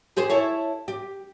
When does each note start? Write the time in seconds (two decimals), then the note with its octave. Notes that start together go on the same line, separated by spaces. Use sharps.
0.17 G4 G#4 C5
0.30 E4 A4 C#5
0.88 G4